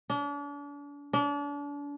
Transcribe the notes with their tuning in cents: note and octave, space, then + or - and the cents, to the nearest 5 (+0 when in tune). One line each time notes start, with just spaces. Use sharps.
D4 -40
D4 -35